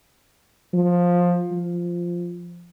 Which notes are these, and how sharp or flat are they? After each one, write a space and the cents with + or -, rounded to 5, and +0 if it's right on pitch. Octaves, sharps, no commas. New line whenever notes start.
F3 +15
F3 -5